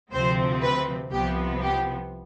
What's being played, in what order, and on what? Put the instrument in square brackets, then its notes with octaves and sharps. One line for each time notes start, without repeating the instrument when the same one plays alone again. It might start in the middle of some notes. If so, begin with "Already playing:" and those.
[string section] D2 C3 F3 C4 C5
B4
C2 C3 F3 B3 G4
G4